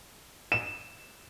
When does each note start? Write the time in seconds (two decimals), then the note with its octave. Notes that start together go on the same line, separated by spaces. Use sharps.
0.52 E7